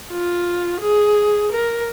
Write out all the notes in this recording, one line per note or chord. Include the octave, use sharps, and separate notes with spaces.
F4
G#4
A#4